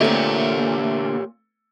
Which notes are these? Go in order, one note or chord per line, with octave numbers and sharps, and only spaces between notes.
A#2 D3 A3 C4 G4 C#5